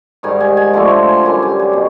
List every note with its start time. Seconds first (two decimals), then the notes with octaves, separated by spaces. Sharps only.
0.23 G#2 D#3 G3 G#5
0.40 G#5
0.57 G#5
0.73 D3 F3 A3 C4 G#5
0.91 G#5
1.08 G#5
1.24 F#2 D3 G3 G#5
1.42 G#5
1.59 G#5
1.73 B2